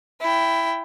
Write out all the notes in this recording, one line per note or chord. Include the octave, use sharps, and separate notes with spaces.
E4 G5